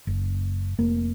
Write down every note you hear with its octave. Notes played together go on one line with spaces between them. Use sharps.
F#1
F1 A#3